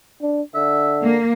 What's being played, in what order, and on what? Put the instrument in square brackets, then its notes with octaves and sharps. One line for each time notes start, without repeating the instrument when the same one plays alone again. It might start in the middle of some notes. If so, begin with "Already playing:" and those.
[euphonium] D4
[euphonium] D3 [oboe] E5
[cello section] A#3